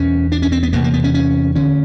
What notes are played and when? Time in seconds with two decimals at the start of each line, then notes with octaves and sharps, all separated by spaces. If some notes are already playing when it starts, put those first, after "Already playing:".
Already playing: E2 B2 C#4
0.32 D4
0.42 C#4
0.52 C4
0.63 B3
0.73 E2 C3 A#3
0.84 A#3
0.94 B3
1.04 C#4
1.14 C#4
1.55 D2 D3 C#4